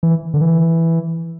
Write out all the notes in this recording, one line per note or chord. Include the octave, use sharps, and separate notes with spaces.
E3
D3
E3